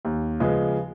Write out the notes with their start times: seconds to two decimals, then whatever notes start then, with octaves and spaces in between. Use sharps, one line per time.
0.05 D#2
0.40 C#3 F3 G#3 B3